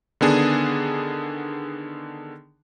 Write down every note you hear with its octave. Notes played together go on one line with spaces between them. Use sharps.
D3 D#3 B3 D4 G#4